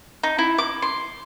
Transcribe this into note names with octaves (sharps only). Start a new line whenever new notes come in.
D#4
E4
D6
C6